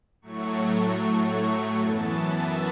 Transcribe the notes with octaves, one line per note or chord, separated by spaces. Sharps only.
A2 F#3 A3 C#6
C#6
F#2 E3 B3 A5
E5